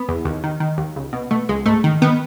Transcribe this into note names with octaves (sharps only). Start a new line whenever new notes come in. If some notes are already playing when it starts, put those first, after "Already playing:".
Already playing: B3
E2
D#2
D#3
D#3
D#2
C#2
B2
B2 A3
C#2 G#3
G#2 A3
D#3
D#3 B3